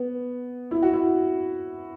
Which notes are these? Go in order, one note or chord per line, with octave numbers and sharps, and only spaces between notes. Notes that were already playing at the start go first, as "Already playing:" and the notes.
Already playing: B3
E4
F#4
E4